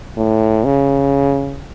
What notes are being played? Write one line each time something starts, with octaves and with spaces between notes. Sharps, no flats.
A2
C#3